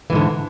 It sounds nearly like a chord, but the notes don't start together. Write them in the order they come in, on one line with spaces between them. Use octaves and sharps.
E3 G#2 D3